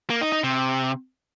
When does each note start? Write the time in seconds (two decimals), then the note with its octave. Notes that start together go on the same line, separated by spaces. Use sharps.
0.10 A#3
0.21 D#4
0.32 D#4
0.43 C3